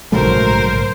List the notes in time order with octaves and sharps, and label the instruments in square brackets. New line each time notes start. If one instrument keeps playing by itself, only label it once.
[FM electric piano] A#1 G#2 [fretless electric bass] C#3 F#3 A3 [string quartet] A#4 [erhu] C5